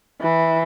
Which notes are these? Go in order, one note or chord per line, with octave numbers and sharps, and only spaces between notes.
E3